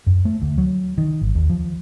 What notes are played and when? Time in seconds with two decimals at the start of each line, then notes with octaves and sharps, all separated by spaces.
0.07 F#2
0.25 A3
0.42 D2
0.58 F#3
0.98 D#3
1.21 G#1
1.35 D#2
1.49 F3